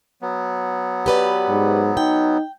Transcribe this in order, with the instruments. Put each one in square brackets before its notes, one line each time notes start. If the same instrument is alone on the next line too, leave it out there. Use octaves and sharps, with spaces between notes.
[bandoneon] F#3 B3
[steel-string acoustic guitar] G4 B4 D5
[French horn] G#2
[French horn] D#4 [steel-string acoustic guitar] G5